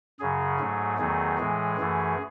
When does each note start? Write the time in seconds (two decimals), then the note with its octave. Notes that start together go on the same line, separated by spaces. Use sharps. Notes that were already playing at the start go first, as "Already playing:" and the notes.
0.20 F#2 C#3 F#3 G#4
0.60 G#2 F#3 A3
0.99 E2 D#3 F#3 A3 G#4
1.39 A2 E3 G#3
1.78 F#2 E3 A3